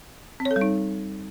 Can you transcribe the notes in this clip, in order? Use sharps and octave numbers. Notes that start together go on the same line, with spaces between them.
C4
C#5
A4
G3
D#4